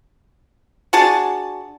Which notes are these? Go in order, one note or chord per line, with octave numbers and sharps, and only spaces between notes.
D4 F#4 G#4 A5